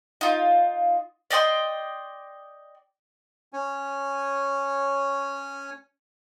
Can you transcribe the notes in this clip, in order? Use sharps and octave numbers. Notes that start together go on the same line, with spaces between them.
D#4 F4
D5 D#5 G5 C6
C#4 C#5 G#5